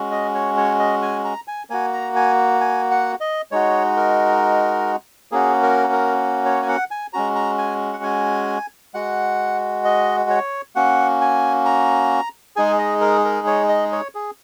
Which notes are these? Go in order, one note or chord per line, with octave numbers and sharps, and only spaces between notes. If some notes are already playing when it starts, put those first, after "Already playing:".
Already playing: G#3 C#4 F#4
D#5
C#5
C#5
D#5
G#5
A#5
G#5
A#3 F#4 G#5
A#5
G#5
G#5
F#5
D#5
G#3 D#4 F#4 C#5
A#4
A#3 C#4 F#4 G#4
A#4
A#4
C#5
G#5
F#5
G#5
G#3 C#4 F#4 A#5
A#5
G#5
F#5
G#5
G#3 F#4 F#5
D#5
C#5
A#3 C#4 F#4 F#5
G#5
A#5
G#3 D#4 G#4 G#5
D#5
A#4
A#4
C#5
D#5
C#5
G#4